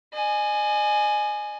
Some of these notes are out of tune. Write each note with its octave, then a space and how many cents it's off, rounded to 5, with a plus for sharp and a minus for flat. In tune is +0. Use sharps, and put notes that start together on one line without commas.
D#5 -45 G#5 +10